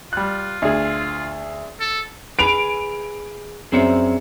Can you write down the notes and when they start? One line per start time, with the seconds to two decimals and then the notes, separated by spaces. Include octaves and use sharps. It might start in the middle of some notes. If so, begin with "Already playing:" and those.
0.13 G3 F4 F#6
0.62 D2 G#4
1.81 A4
2.39 G#4 B4 D7 F7
3.72 F#2 C4 G#4 D5 E5 C#7